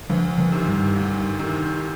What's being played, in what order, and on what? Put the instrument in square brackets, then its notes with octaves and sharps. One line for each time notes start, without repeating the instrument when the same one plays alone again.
[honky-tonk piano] D2 [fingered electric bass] D3 F3
[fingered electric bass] D3 F3
[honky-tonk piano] C3 D#3
[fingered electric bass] G2
[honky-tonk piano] D2
C3 D#3